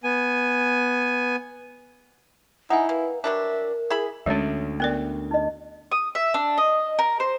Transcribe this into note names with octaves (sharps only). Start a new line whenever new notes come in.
B3 G#5
D#4 E4 F#5 G#5
A#3 B4
F#3 G3 D4 A#4 E5
E4 G#4 E5 B5
D2 D3 G#3 C#4 A4 C#5 E5
B3 C#4 A#4 D5
D#4 D#5
D#6
E5
D4
D#5
A#4
C5